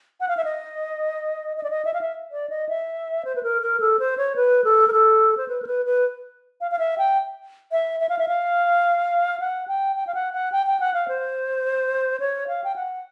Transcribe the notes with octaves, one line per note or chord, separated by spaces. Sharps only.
F#5
F5
E5
D#5
D#5
D5
D#5
E5
F5
E5
D5
D#5
E5
C5
B4
A#4
A#4
A4
C5
C#5
B4
A4
A#4
A4
C5
B4
A#4
B4
B4
F5
F5
E5
G5
E5
E5
F5
E5
F5
F#5
G5
G5
F5
F#5
F#5
G5
G5
F#5
F5
C5
C#5
F5
G5
F#5